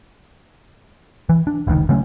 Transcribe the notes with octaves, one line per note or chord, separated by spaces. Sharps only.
E3
D4
F1 C#2 D#3
C#3 F#3 A3 C#4